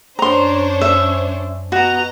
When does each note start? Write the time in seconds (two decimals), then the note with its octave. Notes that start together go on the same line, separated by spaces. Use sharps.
0.19 F#2 C#4 D4 C5 C#5 A#5 C6
0.81 E5
1.72 B3 F#4 D#5 A#5